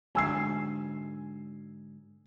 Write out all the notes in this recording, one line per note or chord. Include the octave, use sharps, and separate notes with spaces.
G#2 D3 F#3 G#5 E6 C7